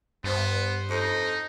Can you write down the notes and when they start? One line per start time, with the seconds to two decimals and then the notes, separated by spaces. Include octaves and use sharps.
0.24 G2 B3 C5
0.90 F2 D#4